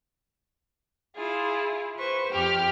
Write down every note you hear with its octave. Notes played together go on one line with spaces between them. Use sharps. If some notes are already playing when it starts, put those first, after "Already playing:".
E4 F4 G#4
B4 C5 C#6
F2 G4 F6